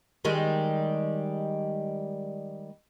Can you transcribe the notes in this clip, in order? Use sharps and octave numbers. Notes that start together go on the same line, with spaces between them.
D#3 G3 G#3